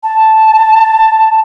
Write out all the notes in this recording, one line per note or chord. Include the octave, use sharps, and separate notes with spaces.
A5